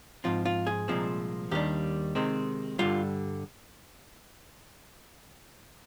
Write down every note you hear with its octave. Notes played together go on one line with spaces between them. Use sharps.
G#2 F3 C4 F4
F4
G#4
C2 A#2 F3 G#3 C4
D#2 D#3 G3 D4 G4
C3 D#3 G#3 C4
G2 D3 G3 F4